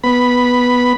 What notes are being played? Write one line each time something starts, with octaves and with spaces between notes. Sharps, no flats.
B3 B5